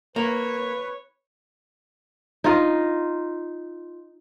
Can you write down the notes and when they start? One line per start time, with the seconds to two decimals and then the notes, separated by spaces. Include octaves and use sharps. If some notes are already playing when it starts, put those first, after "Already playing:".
0.16 A#3 B4 C#5
2.44 D#4 F4 D#5